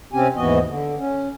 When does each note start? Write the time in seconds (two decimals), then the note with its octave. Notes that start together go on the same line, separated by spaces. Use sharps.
0.13 C3 C4 C#4 G4 G#5
0.36 D#2 G#2 E3 B3 F#4 D#5
0.67 D3
0.98 C#4